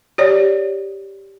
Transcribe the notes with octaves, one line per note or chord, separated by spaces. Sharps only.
G4 C#5 D5